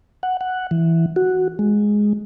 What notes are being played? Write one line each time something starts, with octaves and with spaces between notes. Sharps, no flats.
F#5
F#5
E3
F#4
G#3